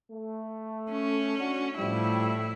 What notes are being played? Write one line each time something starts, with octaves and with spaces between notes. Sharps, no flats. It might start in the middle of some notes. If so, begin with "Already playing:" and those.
A3
C#4
D4 F#4
A2 F3 G3 E4